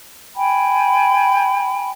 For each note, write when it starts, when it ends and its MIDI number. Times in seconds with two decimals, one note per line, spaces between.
0.35 1.91 79
0.35 1.91 80
0.35 1.91 83